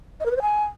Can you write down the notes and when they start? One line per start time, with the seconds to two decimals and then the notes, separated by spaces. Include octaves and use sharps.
0.20 D#5
0.26 A#4
0.31 B4
0.36 C5
0.42 G#5